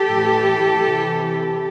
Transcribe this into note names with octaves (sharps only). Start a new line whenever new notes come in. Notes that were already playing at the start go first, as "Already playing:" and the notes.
Already playing: G4 A4
A2 E3
C3 E3